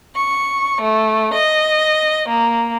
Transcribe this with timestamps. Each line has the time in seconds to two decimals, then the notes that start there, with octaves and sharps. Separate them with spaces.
0.14 C#6
0.81 A3
1.34 D#5
2.28 A#3